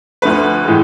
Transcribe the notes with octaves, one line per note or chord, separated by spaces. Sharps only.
D2 D3 F3 A3 B4
A2 E3 G#3